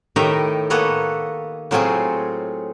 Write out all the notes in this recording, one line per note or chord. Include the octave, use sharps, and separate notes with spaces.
A2 D#3 G4 D#5 E5 A#5
A#3 B3 A4 B4 C#5 D#5
A2 F#3 C4 F4 G#4 G#5